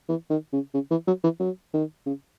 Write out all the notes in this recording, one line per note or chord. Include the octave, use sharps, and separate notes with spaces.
E3
D#3
C#3
C#3
E3
F#3
E3
F#3
D#3
C#3